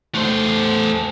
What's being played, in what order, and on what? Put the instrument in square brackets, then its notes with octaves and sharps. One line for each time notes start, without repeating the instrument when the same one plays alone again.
[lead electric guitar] A3 C5